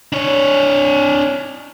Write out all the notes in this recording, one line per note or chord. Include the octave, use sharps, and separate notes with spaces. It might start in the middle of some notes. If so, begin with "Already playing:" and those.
D4 C#5